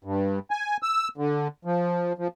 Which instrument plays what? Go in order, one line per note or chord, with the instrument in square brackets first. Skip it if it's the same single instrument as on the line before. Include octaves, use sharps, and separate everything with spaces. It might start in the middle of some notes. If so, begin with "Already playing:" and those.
[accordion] G2
G#5
E6
D3
F3
F3